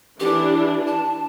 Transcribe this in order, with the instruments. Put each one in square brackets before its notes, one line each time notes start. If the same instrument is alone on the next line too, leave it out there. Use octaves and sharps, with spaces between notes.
[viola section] E3 D4 [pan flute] G4
[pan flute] A5